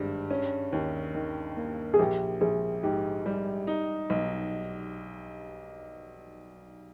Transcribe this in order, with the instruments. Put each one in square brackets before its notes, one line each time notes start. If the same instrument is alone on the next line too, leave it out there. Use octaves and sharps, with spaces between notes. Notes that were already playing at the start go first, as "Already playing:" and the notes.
Already playing: [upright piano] G#1 G2 G3 [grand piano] G#3
[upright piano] C#4
D#2
D#3
A#3
[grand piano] G#4
[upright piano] A#1 [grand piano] G4
[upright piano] A#1 [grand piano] G#4
[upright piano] G#2 [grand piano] G4
[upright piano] G3
D#4
B1